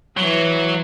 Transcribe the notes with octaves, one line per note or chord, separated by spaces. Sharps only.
E3 F#3